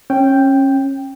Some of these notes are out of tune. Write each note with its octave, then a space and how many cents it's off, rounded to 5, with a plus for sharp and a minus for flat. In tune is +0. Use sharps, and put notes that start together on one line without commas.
C#4 -25 G5 +0